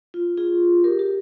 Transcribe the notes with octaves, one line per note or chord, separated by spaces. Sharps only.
F4
F4 G#4
G4 A#4
G4 A#4